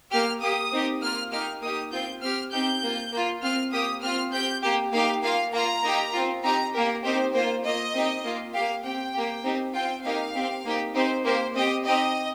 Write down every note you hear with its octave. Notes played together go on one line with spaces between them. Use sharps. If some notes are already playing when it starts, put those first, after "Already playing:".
A#3 G4 F6
A#3 G4 D#6
C4 D#4 G4
A#3 F4 F6
A#3 D#4 G4 F6
A#3 D#4 G4 D#6
C4 F4 G6
C4 G4 F6
C4 D#4 G4 G6
A#3 F4
A#3 F4
C4 F4 F6
A#3 G4 D#6
C4 F4 F6
C4 G4 G6
A#3 G4
A#3 D#4 G4 F5
A#3 F4 F5
A#3 F4 A#5
A#3 D#4 G4
C4 F4
C4 D#4 G4 A#5
A#3 G4 A#4
C4 D#4 G4 C5
A#3 F4 C5
A#3 F4 D#5
C4 D#4 G4
A#3 F4
A#3 G4 F5
C4 G4 G5
A#3 G4
C4 D#4 G4
C4 F4 G5
A#3 D#4 G4 F5
C4 G4
A#3 D#4 G4
C4 D#4 G4 C5
A#3 G4 C5
C4 G4 D#5
C4 D#4 G4 D#5